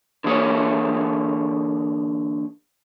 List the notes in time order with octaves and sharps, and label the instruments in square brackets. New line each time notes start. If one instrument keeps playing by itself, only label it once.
[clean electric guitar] D3 E3 A#3 G#4 A#4 C#5